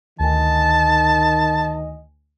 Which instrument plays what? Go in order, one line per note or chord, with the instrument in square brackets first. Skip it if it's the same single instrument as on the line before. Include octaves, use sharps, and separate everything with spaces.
[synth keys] D2 G#5 [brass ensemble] D#3 D#5 [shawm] A5